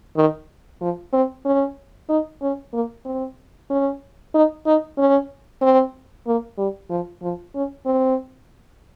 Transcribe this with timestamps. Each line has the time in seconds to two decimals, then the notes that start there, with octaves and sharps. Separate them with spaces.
0.16 D#3
0.81 F3
1.13 C4
1.45 C#4
2.09 D#4
2.42 C#4
2.73 A#3
3.05 C4
3.70 C#4
4.34 D#4
4.66 D#4
4.98 C#4
5.61 C4
6.26 A#3
6.58 G3
6.89 F3
7.22 F3
7.55 C#4
7.86 C4